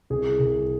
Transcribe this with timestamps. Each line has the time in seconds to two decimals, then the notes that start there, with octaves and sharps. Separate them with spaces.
0.10 C2 G#4
0.40 C2